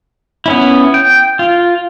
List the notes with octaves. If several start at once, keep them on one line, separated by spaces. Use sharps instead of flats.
B3 C#4 E4
G5
F4